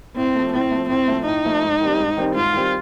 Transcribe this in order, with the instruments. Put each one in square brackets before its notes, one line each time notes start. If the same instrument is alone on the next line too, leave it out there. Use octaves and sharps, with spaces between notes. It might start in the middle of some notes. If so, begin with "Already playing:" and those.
[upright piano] A2 [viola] C4
[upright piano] F3 A3
[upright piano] A2 [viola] C4
[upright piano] F3 A3
[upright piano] A2 [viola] C4
[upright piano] F3 A3
[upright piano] A2 [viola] D#4
[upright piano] F3 A3
G#2
D#3 G3 C4
G#2
D#3 G3 C4
[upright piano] G#2 [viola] F4
[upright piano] D#3 G3 C4